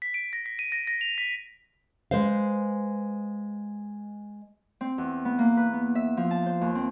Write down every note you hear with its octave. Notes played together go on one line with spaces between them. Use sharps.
B6
D7
A#6
B6
D#7
A#6
A#6
F7
B6
G#3 B4 C5 F5
C4
E2
B3
A#3
B4
B3
E5
F3
A5
C5
D#2
C4